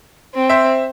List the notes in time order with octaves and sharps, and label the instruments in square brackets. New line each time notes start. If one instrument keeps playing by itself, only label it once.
[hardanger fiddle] C4
[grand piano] C5 E5